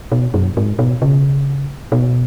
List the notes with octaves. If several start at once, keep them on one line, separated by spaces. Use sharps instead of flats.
B2
F#2
G#2
B2
C#3
B2